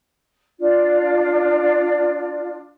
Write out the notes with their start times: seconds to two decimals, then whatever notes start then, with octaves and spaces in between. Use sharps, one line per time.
0.59 D4 F4